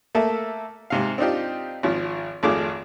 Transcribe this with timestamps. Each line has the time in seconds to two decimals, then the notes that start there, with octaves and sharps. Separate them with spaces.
0.15 A3 A#3 A4 E5
0.90 G#2 C3 F5
1.18 C4 D4 D#4 F4 G4
1.83 G#1 F3
2.43 G#1 F2 A3 F4 G#4 D6